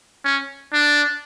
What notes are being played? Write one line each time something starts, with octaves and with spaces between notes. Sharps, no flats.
C#4
D4